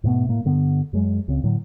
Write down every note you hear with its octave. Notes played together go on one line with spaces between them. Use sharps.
G#2 B2 A3 B3
A2 A#3
G2 D3 B3
F#2 F#3 G#3
C#2 C#3 C4
A2 D3 F#3